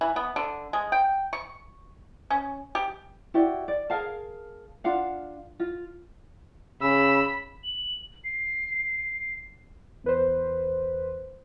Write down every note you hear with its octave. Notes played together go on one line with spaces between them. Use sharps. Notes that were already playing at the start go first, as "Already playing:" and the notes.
E3
B3
D3
G#3
G5
C#6
C#4
G4
E4 F#4 G4 D5
D5
G#4 A#4 F5 A5
D4 F4 F5 F#5
F4
C#3 B5 E6
F#7
C7
E2 B4 C5